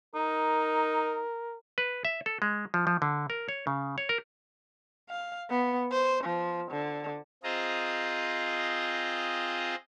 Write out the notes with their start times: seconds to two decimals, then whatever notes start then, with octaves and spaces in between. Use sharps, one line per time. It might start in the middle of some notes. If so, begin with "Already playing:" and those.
0.15 D#4 A#4
1.78 B4
2.05 E5
2.26 A4
2.42 G#3
2.74 F3
2.87 F3
3.02 D3
3.30 A#4
3.49 C#5
3.67 C#3
3.98 C#5
4.09 A#4
5.10 F5
5.50 B3
5.92 C5
6.24 F3
6.72 D3
7.44 C4 F4 G#4 C5 D#5 A#5